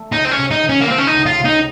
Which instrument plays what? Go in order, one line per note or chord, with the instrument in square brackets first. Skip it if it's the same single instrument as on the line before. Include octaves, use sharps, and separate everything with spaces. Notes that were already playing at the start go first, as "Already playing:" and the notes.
Already playing: [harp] A3
[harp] C#2 [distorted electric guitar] D#4
[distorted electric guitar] C4
C#4
[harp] C3
[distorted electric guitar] D#4
[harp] D#3
[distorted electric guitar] C#4
A#3
[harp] A3 [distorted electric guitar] C4
[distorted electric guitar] C#4
D#4
[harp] C#2
[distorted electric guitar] F4
[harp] C3
[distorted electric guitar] D#4